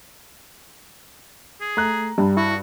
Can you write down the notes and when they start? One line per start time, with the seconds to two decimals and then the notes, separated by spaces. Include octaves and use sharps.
1.61 G#4
1.77 A3 A#5 F#6
2.18 G2 G3
2.37 E4 F#4 C#6